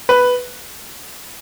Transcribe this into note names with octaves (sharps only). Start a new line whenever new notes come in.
B4